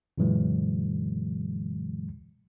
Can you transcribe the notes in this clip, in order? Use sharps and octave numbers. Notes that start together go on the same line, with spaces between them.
F#2 A#2 D3 E3 F#3 G#3